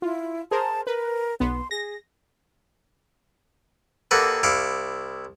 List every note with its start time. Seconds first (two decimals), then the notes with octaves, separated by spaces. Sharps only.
0.02 E4 F4
0.51 G#4 A#4 C5 A5
0.87 A#4 B4
1.40 B1 B3 C6
1.71 G#4 A#6
4.11 D#2 A#3 F#4 A4 B4
4.43 C2 E4 F5 C#6 D6